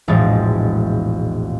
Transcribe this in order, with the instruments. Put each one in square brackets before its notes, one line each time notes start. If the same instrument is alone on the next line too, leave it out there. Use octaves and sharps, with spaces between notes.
[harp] E1 A#1 A2 G#3 A6